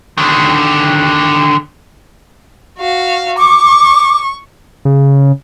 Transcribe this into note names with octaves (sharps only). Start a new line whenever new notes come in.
D3 D#3
F#4 F5
C#6 D6
C#3